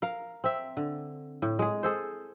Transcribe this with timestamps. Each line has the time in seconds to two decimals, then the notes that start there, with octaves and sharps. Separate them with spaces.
0.02 A#4 F5
0.44 C4 E5
0.77 D3
1.42 A2
1.59 G#3 G#4
1.83 G#4 A4 C5